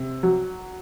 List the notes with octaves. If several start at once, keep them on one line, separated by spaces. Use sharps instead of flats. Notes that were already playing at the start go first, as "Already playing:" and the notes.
Already playing: C3
F#3